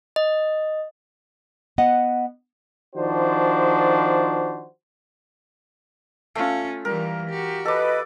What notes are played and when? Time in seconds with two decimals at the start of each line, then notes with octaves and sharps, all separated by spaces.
0.16 D#5
1.78 B3 D#5 F#5
2.95 D#3 F3 D4 F#4 C5
6.35 A3 C#4 F4
6.85 E3 G3 A#4
7.30 F#4 G4
7.65 A4 B4 D#5 D6